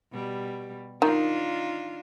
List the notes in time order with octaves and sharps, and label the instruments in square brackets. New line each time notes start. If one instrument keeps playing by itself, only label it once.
[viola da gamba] B2 G3
[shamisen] D#3 [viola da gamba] D4 D#4 F4